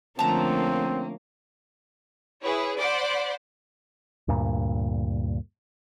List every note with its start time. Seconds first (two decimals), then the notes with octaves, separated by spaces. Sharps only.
0.19 D3 F3 A3 A#3 C4 C#4 A5 A#5
2.41 E4 G#4 B4 C#5
2.79 C5 D5 F#5 B5 C6 D6
4.28 D2 G2 A#2